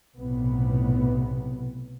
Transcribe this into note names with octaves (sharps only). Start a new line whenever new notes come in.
B1 A2 C3 B3